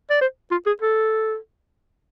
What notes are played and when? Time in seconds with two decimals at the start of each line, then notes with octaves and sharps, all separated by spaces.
0.10 D5
0.21 C5
0.51 F4
0.67 G#4
0.82 A4